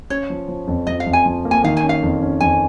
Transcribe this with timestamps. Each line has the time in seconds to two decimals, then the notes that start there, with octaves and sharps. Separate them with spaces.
0.10 C#4 C#5
0.30 F3
0.48 F3
0.68 F2
0.87 F3 D#5
1.00 F5
1.06 F2
1.13 G#5
1.26 F3
1.45 A#3
1.51 G#5
1.64 D#3 F5
1.77 G#5
1.83 C#4
1.89 F5
2.03 F2
2.22 C#4
2.41 F2 G#5